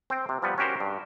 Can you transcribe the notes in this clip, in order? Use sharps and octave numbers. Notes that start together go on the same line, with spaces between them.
C4 C5 G5
C3
F3 G3 B3
C#4 F#4 G4 A#4 C5
G2